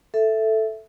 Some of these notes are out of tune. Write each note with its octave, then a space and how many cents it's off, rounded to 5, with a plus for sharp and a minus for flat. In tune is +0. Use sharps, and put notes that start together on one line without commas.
A4 +0 E5 +0